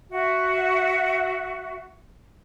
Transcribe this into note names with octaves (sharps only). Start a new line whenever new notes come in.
F#4 E5